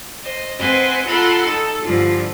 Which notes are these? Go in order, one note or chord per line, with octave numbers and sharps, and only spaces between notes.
C5 D#5
C4 B4 C5 D#5 F#5 G#5
F4 A4 A#4 F#5 B5 C6
D#4 A4
G2 D3 E3 F3 F4